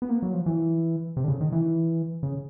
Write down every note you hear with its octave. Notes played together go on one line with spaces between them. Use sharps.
B3
A#3
F#3
F3
E3
C3
D3
C#3
D#3
E3
C#3